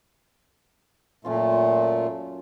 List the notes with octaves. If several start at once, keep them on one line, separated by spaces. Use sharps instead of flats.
F#2 A#2 A3 C#4 F4